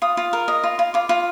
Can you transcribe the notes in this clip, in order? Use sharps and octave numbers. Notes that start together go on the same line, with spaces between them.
F4 D#6
F4
A#4
D#5
F4
F4
F4 D6
F4